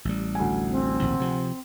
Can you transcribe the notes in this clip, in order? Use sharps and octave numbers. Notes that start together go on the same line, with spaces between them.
A1 G3
D2 G#5
C4
A#1 D#2 A2
C3 F3